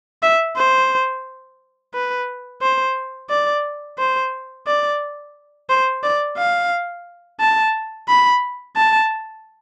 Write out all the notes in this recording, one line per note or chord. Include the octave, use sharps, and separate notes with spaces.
E5
C5
B4
C5
D5
C5
D5
C5
D5
F5
A5
B5
A5